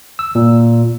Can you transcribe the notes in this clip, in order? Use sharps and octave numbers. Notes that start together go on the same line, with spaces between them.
E6
A#2